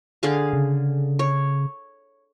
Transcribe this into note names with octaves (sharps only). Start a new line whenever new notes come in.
D3 G#4 F5
C#3
C#5